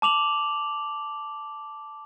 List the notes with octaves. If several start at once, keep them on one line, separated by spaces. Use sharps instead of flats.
A5 D6 F7 F#7